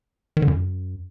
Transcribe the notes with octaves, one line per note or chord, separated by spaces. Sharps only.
D#3
D3
F#2